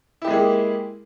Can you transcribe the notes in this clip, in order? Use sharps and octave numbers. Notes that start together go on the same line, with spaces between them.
G#3 A#3 E4 G4 G#4